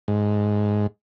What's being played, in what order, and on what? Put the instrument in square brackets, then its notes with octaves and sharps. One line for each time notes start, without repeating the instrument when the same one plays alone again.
[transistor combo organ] G#2